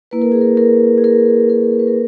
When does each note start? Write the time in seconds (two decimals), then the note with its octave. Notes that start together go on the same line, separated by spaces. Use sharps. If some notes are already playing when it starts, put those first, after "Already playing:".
0.11 A#3 E4 B4
0.22 A#4
0.32 G#4
0.41 A#4
0.57 A#4
0.98 G#4
1.04 A#4
1.50 A#4
1.79 B4
1.87 A#4